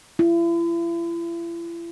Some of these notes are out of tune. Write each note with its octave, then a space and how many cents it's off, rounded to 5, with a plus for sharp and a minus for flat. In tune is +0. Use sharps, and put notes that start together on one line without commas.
E4 +40